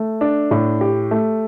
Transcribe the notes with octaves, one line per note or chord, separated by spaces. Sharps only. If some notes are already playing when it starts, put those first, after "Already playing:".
Already playing: A3
D4
A2
G4
A3